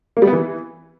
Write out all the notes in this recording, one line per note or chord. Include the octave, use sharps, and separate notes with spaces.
A#3
G3
B3
E3